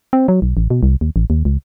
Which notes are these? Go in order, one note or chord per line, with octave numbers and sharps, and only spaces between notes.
C4
F#3
B1
A1
B2
C2
D#2
A1
D#2
C#2